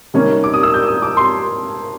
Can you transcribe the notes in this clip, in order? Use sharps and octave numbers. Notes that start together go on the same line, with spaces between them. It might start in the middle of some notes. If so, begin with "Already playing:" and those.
C3 D#3 G3 A#3 C#4
D6
D#6
E6
G6
D#6
D6
C6